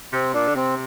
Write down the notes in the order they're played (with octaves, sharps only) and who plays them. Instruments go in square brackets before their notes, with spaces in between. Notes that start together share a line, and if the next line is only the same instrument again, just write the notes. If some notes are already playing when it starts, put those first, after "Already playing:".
[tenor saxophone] C3 [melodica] C4
[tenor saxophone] A#2 [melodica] D4
[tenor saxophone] D3
[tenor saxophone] C3 [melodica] C4